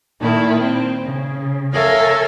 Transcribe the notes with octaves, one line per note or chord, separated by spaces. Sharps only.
A#2 D#3 A3 E4
C4
C#3
A4 A#4 C#5 E5 F5 G#5